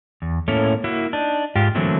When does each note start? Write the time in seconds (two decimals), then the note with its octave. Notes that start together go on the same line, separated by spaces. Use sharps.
0.22 E2
0.48 A2 A#3 C#4 E4 A4 C#5
0.84 A#3 E4 F#4
1.13 D4 D#4
1.56 G#2 F4 G4
1.75 D3 E3 F#3 A3 A#3 C4